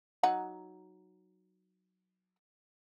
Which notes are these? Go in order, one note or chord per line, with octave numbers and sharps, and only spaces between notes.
F#3 D#4 F#5